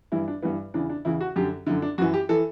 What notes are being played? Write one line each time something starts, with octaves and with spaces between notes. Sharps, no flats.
G2 E3 E4
D4
G2 E3 B3
E2 C#3 E3 D4
D4
E2 C#3 E3 E4
F#4
F#2 D3 G4
F#2 D3 E4
D4
F#2 E3 F#4
G4
E3 A4